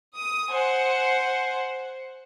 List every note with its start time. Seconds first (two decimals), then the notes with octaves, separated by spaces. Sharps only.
0.15 D#6
0.49 C5 F#5 G#5